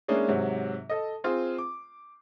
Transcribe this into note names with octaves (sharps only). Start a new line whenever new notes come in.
G#3 A#3 C#4 D4 E4 G#4
G#2 C3 F#3
A4 D#5
C4 F4 G#4 C5
D6